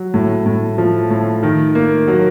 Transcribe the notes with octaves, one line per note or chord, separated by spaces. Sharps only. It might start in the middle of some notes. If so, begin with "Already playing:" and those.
Already playing: F#3
A2
A2
F3
A2
D#3
A#3
F#3